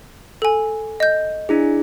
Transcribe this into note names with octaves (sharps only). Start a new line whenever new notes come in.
A4 G#5
D#5 G6
D4 E4 G#4